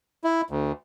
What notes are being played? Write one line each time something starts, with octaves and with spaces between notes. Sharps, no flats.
E4
D2